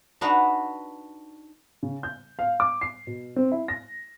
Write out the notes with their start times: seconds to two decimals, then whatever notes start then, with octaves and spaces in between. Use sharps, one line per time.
0.21 D4 D#4 F#4 B4
1.83 C#3
2.03 G6
2.39 F5
2.60 D6
2.81 C7
3.07 B2
3.36 C4
3.52 E4
3.68 A#6